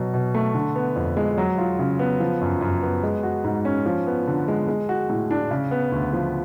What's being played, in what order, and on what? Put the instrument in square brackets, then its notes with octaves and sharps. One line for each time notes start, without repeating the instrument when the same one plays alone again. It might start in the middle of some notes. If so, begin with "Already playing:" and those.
Already playing: [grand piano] B2 F#3
B2
A3
D3
B3
F2
G#3
F#3
F4
C#3
B3
F3
F#2
F#2
B3
G#3
F#4
G#2
C#4
F3
B3
D3
G#3
G#3
F#4
A2
D4
C#3
B3
D2
F3